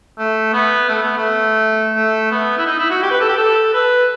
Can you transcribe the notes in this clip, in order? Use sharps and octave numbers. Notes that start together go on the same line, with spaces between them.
A3
B3
A3
B3
A3
A3
B3
E4
D#4
E4
F#4
G4
B4
A4
G4
A4
B4